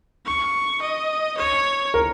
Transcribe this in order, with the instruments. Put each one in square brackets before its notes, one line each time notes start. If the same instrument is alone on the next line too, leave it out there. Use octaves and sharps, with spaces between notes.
[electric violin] C#6
D#5
C#5
[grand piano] A#4